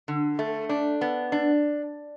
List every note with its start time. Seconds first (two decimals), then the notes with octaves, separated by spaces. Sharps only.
0.08 D3
0.39 A3
0.69 D4
1.01 B3
1.32 D4